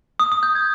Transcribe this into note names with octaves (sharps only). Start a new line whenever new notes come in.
D#6
D#6
G6
G#6